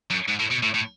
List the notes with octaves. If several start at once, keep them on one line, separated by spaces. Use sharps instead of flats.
F#2
G#2
A2
B2
A2
A2